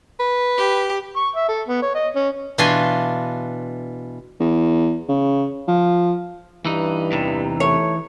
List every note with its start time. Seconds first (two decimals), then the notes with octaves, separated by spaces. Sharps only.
0.20 B4
0.57 G4
1.16 C#6
1.36 E5
1.48 A4
1.68 B3
1.82 C#5
1.95 D#5
2.16 C#4
2.58 B2 E3 D4 F4 G#5 C6
4.40 E2
5.08 C#3
5.68 F3
6.65 G2 E3 D#4
7.12 E2 C3
7.60 A3 C#5